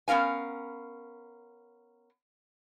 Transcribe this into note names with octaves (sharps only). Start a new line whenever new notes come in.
B3 C#4 A#4 F5 G#5